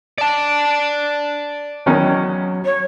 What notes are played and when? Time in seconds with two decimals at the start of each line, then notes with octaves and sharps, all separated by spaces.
0.18 D5 A5
1.86 E2 D#3 F#3 C#4
2.65 C#5